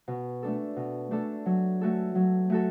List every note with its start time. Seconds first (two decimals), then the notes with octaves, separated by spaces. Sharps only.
0.08 B2
0.43 A3 D4 A4
0.76 B2
1.11 A3 D4 A4
1.46 F#3
1.81 A3 F#4 A4
2.15 F#3
2.50 A3 F#4 A4